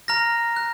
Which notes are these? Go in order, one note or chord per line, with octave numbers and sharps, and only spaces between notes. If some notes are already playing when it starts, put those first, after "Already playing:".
A#5 F6 A#6
F#6